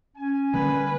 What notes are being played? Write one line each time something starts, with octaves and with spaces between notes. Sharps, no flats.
C#4 G#5
D3 G3 A#3 B4